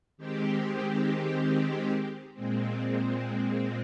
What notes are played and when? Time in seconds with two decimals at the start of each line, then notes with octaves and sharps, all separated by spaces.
0.17 D#3 G#3 C4 G4
2.34 A#2 G#3 C4